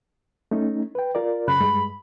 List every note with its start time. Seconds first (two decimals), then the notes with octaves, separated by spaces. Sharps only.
0.51 A3 C#4 D#4
0.95 B4 G5
1.15 F4 A#4 D5
1.48 F#2 C#3 B5 F#6
1.60 G2 G#3